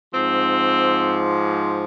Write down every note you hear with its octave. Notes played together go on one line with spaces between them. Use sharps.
G#2 F3 C4